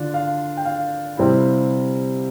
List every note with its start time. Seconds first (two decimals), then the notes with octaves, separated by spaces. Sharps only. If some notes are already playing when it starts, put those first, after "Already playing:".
Already playing: D3 D4 F4
0.14 F5
0.57 G5
0.65 F5
1.17 C3 G3 C4 E4